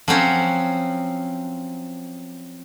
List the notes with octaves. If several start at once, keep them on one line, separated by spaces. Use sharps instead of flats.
F3 F#3 C4 C#4